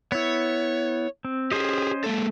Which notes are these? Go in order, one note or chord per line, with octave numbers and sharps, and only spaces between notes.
B3 E4 C#5
C4
C#4 G4 G#4 C5 D#5
G#3 A#3 A4